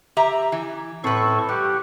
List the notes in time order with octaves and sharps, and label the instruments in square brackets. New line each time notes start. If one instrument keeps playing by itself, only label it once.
[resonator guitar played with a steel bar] G4 E5 A#5
E3
[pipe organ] A2 A4 C#6 [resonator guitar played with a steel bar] C4 B4
[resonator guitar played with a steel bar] G3 [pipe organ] G4 F#5